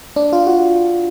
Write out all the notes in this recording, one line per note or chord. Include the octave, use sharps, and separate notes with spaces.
D4
F4
F#4